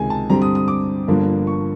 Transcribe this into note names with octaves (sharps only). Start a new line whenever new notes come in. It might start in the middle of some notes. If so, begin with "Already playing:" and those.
Already playing: C#2 C3 D#3 G#3 G#5
A5
G2 D3 G3 C4 A#5
D#6
D#6
D6
G1 G2 D3 F3 A#3
C#6